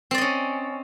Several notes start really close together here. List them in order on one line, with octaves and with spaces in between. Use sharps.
C4 D5 D#5 C#4